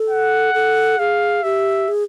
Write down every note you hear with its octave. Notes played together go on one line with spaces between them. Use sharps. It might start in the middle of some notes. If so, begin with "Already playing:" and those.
Already playing: A4
F#5
A4
G#4 F5
G4 E5
G#4